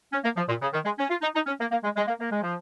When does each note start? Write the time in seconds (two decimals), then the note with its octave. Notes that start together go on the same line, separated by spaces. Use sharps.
0.13 C#4
0.24 A#3
0.37 F3
0.49 A#2
0.62 C#3
0.73 D#3
0.85 G#3
0.99 C#4
1.10 F4
1.22 D#4
1.35 D#4
1.47 C#4
1.60 A#3
1.71 A#3
1.83 G#3
1.96 G#3
2.08 A#3
2.20 A#3
2.31 G#3
2.43 F3